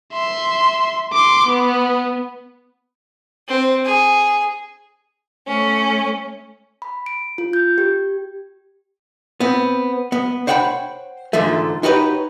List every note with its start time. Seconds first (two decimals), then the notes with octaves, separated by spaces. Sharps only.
0.13 E5 C6
1.13 C6 D6
1.46 B3
3.48 C4
3.85 G#4
5.47 A3 C#4
6.82 B5
7.06 D7
7.38 F4
7.53 G6
7.78 G4
9.40 B3 C4
10.12 B3
10.47 C5 C#5 F#5 G5 A5 B5
11.33 G#2 D3 E3 F3 A3
11.83 D#4 F#4 G4 A4 B4 C#5